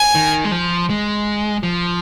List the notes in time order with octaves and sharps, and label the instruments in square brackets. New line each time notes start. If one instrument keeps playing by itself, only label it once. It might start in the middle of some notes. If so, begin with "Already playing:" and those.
Already playing: [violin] G#5
[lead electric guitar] D#3
G#3
F3
G#3
F3